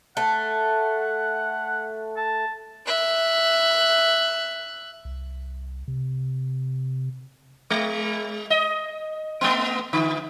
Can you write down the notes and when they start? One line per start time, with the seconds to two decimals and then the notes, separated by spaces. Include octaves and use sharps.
0.17 A3 F#5
2.16 A5
2.87 E5 F#6
5.05 C2
5.88 C3
7.70 G#3
8.50 D#5
9.41 A3 B3
9.93 D3